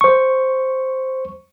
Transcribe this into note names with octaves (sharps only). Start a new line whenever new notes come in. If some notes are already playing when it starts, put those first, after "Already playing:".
C5 C#6